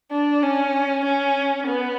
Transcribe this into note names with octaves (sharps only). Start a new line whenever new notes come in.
D4
C#4
C#4
B3